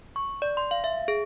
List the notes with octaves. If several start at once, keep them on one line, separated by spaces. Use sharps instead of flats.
C#6
D5
C6
F5
E5
G#4